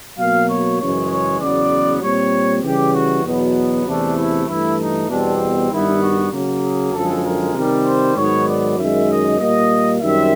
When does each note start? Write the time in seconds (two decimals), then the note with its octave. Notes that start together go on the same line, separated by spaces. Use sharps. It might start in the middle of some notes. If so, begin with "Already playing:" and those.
0.18 B2 F#3 A#3 F5
0.48 C#5
0.79 F#2 C#3 E3 G#3 C#5
1.10 C#5
1.41 E2 C#3 F#3 B3 D5
2.02 A#2 G3 C4 C#5
2.63 C#3 E3 G3 G4
2.94 F#4
3.25 E2 B2 F#3 B3
3.86 E2 C3 E3 A3 D4
4.16 E4
4.47 G2 E3 A3 E4
4.79 D#4
5.08 E2 B2 G3 C4 D4
5.71 G2 D#3 G3 B3 E4
6.01 F#4
6.32 C#3 F#3 A#3
6.62 G#4
6.93 F#2 D3 F3 G#3 A4
7.24 A#4
7.54 C3 D#3 G3
7.85 C5
8.16 G#2 D#3 F#3 B3 C#5
8.46 D5
8.78 F#2 D#3 G#3 E5
9.08 D#5
9.39 A#2 G3 A#3 D#5
10.00 F#2 D#3 G3 C4 E5